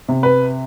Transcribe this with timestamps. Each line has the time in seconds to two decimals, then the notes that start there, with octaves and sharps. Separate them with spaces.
0.09 C3
0.23 B4